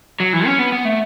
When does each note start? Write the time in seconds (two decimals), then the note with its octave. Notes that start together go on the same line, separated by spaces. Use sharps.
0.20 F#3
0.33 E3
0.46 C#4
0.59 B3
0.72 B3
0.85 A3